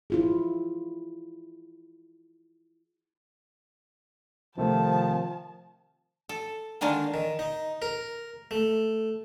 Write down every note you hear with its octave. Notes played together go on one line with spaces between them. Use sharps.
E4 F4 G#4
C3 D#3 F3 A3 A5
A4
D3 D#3 G#3 A#3 D4
D#3
D#4
A#4
A3